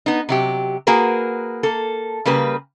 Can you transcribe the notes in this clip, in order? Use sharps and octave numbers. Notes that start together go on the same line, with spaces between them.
B3 D#4
C3 F#3 G4
A#3 F#4 G#4 A#4 B4
A#3 A4
C#3 G3 A#3 B4